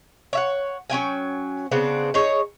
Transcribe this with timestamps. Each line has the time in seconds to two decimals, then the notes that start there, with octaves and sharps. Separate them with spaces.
0.33 C#5 E5 F#5
0.90 F#3 C#4 G5 G#5
1.72 C#3 B3 C4 D4
2.14 D#4 G#4 C#5